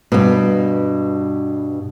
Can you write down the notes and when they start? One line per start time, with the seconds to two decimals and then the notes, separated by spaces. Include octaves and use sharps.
0.12 G2 B2